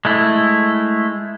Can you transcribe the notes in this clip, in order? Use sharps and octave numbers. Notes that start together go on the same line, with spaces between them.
G#3 A3 E4